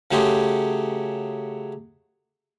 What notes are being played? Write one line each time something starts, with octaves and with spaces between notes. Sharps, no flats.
C#3 F#3 A3 G4 G#4 C6